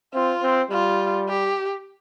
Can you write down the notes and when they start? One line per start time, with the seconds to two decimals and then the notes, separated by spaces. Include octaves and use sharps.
0.14 C4 F4
0.42 C4
0.71 G3 F4
1.29 G4